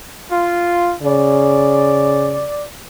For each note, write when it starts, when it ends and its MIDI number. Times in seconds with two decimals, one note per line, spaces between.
0.31 0.96 65
1.03 2.48 49
1.03 2.64 74